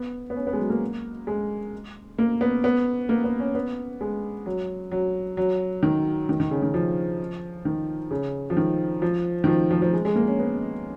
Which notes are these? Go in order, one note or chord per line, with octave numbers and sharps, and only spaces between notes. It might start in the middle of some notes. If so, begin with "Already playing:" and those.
Already playing: B3
B3
C#4
B3
G#3
F#3
A#3
G#3
A#3
B3
B3
A#3
B3
C#4
B3
G#3
F#3
F#3
F#3
D#3
D#3
D#3
C#3
D#3
F3
D#3
C#3
F3
D#3
F3
D#3
F3
F3
F3
G#3
G#3
A#3
C#4
B3